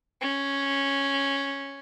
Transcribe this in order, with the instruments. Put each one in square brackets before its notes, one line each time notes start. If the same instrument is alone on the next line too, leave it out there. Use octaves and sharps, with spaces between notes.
[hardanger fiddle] C#4